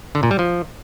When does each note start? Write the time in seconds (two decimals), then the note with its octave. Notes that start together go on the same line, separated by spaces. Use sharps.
0.15 D3
0.23 A#2
0.31 G3
0.39 F3